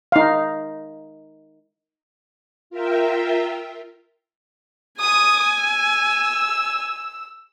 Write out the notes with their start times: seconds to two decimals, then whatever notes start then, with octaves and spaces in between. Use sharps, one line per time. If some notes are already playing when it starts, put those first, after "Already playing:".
0.12 D#4 F5
2.70 F4 A#4 E5 G5
5.01 G#5 D#6
5.63 E6